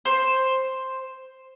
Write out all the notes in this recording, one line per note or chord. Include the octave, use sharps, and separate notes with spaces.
C5